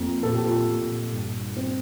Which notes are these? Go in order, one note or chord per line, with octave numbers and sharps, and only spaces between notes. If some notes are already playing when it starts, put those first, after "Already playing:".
Already playing: F2 A#3
A#2 A4
G4
F4 A4
A#2
G2
C4